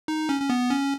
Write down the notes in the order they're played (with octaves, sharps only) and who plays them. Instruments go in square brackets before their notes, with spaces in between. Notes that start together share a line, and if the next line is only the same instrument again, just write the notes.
[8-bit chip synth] D#4
C#4
C#4
B3
C#4